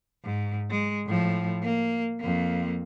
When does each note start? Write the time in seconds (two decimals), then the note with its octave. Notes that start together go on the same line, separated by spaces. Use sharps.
0.25 G#2
0.71 G#3
1.07 A2 F3
1.63 A#3
2.20 F2 A#3